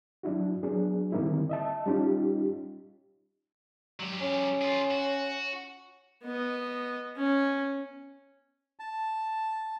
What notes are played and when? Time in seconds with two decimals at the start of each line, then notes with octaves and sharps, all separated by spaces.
0.23 F#3 D4 E4 F#4
0.63 F#3 B3 D4 G#4
1.12 D3 D#3 G3 A#3 C4 E4
1.49 D#5 E5 A5
1.86 G3 C#4 D#4 F4 G4
4.00 F#3 G4
4.21 C#4
4.61 F4 G#4
4.91 F#4
6.23 B3 D#5
7.16 C#4
8.79 A5